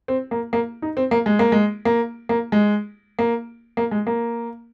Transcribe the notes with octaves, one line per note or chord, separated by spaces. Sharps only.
C4
A#3
A#3
D#4
C4
A#3
G#3
A#3
G#3
A#3
A#3
G#3
A#3
A#3
G#3
A#3